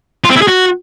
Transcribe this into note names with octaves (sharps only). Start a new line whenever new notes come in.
F4
C4
E4
G#4
F#4